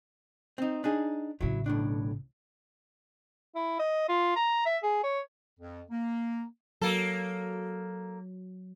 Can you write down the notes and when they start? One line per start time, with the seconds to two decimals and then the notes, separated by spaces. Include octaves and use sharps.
0.58 C4 D#4
0.84 D4 D#4 G#4
1.41 A1 C#3 F#3 E4
1.66 B1 A2 D4
3.55 E4
3.80 D#5
4.09 F4
4.36 A#5
4.66 E5
4.83 G#4
5.04 C#5
5.60 F2
5.90 A#3
6.82 F#3 A#3 A4